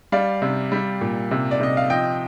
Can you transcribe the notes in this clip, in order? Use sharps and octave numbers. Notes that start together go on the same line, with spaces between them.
G3 D5 F5
C3
G3
A#2
C3
D5
C3 D#5
F5
F3 D#5 G5